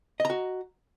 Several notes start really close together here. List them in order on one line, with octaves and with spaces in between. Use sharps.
D#5 A#5 F#4